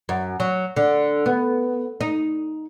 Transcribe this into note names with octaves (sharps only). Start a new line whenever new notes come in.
F#2
F#3
D3
B3
D#4